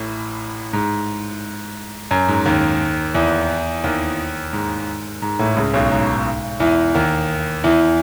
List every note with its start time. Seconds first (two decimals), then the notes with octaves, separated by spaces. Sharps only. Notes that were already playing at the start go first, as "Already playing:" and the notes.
Already playing: A1 A2
0.73 G#2
2.11 F#2
2.28 G#2
2.45 D#2 D#3
3.14 E2 E3
3.84 D#2 D#3
4.53 G#2
5.22 G#2
5.39 A1 A2
5.57 C#2 C#3
5.74 B1 B2
5.91 G#2
6.60 E2 E3
6.94 D#2 D#3
7.64 E2 E3